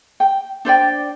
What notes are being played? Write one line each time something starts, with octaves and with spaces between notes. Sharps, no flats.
G5
D4 C5 D5 G5